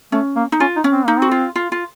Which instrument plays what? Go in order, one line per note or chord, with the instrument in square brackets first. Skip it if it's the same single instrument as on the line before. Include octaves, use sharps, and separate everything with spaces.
[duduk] A3 [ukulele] C#4
[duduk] A#3
[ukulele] D#4
[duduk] C#4 [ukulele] F4
[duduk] D#4
[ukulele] C#4
[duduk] C4
[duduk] A#3 [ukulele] D#4
[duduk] C4 [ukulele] F#4
[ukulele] F4
F4
F4